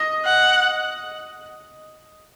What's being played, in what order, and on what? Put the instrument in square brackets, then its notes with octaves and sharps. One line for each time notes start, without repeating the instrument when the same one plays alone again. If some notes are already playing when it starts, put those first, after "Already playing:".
Already playing: [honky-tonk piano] D#5
[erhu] F#5